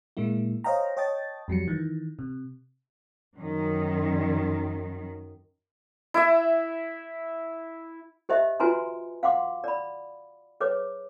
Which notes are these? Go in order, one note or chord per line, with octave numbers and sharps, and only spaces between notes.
A#2 G#3 A#3 E4
C5 C#5 D#5 F5 G5 A#5
C#5 D#5 G5 A5 A6
F2 F#3 G3 C#7
D#3 E3
C3
F#2 D#3
E4 E5
G4 C5 D#5 E5
F4 F#4 B4 G#5 A#5 C6
F5 F#5 C6 D6
D5 B5
G#4 B4 C#5 D6